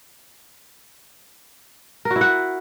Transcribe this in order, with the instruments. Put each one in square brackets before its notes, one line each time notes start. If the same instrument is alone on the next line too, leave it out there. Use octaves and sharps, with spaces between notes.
[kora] A#4
F#4
E4
F#5